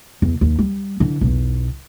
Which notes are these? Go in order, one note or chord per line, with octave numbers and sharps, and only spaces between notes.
E2
D#2
G3
D3 E3
B1 E2